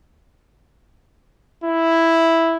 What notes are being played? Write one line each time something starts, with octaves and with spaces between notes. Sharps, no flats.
E4